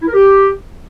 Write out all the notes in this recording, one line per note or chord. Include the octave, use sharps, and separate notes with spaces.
E4
A#4
G4